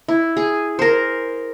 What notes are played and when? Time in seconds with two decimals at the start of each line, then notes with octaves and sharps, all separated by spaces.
0.08 E4
0.37 G#4
0.79 A#4 C5